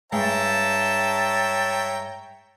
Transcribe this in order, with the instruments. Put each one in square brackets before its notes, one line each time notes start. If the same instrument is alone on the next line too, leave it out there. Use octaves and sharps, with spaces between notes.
[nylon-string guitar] G2 G#3 F5 [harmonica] C#5 G5 A#5 [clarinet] E5 [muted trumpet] A5